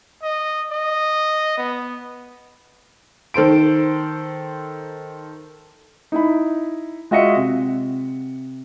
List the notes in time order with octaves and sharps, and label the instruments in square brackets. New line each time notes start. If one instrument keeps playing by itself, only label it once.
[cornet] D#5
D#5
B3
[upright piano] D#3 A4 C5 D7
[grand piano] D#4 E4 B5
G#3 F4 F#4 D#5 E5 C#7
C3